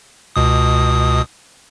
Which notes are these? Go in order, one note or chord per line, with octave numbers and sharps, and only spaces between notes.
C#2 B2 D#6